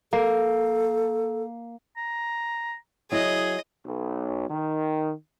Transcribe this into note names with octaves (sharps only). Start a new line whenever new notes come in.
A#3 A4
A#5
F#3 E4 G#4 D#5
B1
D#3